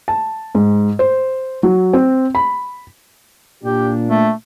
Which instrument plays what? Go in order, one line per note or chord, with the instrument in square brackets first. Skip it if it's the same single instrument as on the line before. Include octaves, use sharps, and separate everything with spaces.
[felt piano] A5
G#2
C5
F#3
C4
B5
[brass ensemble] A#2 D4 [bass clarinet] G4
[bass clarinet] A3